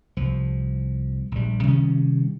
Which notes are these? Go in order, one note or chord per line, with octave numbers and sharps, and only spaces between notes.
C2 F3
A#1 G3
C3 D#3 G3 C#4